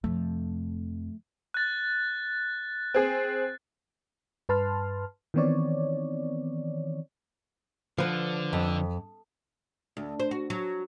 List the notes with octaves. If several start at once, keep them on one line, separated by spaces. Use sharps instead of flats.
F2 C3 A3
F#6 A6
C4 G#4
G2 B4 A5 C6 F6
D#3 E3 B3 C4 C#5 D5
D3 F3 B4
F2
D2
C5
F#4
F#3